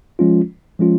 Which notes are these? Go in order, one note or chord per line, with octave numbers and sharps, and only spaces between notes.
F3 G#3 C#4 F4
F3 G#3 C#4 F4